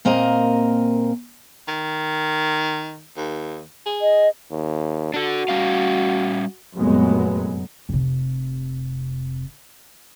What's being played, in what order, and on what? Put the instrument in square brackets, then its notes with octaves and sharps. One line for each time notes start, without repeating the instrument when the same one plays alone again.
[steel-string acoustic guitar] A#2 A#3 C4 A#4 D#5 A#5
[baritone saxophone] D#3
D#2
G#4
[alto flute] D#5
[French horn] D#2
[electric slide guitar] D4 A4 [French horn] F#4
[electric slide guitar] G3 C#4 F5
[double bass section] F1 F#2 A#2 F#3 G#3 B3
[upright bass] F1 C3